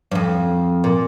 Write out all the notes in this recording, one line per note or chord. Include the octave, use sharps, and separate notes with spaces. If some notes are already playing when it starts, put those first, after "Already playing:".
G2
F2
A#2